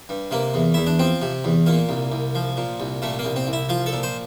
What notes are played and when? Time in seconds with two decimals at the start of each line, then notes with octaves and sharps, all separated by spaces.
0.09 G2
0.31 C3 A#3
0.54 E2
0.74 E2 E4
0.87 D4
0.99 F3 C4
1.22 C3
1.44 E2
1.66 A#2 A#3
1.89 C2
2.12 C2
2.35 F3
2.57 A#2
2.80 C2
3.02 A#2 A3
3.19 A#3
3.24 C2
3.36 C4
3.47 C2
3.53 E4
3.69 F3 F4
3.86 A4
3.92 A#2
4.03 C5